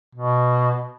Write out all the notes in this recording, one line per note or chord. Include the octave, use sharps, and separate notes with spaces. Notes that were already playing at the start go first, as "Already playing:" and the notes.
B2